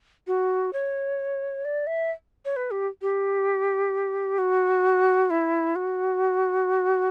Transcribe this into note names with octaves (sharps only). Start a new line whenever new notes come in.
F#4
C#5
D5
E5
C#5
B4
G4
G4
F#4
E4
F#4